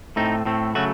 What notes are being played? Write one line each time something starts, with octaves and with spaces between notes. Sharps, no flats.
A2 A3 C4 D#4
A2 A3 C4
C#3 F#3 A3 F#4